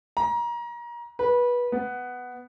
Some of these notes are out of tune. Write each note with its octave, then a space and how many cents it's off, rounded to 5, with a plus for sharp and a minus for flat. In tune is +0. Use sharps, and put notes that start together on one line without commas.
A#5 +30
B4 -20
B3 +5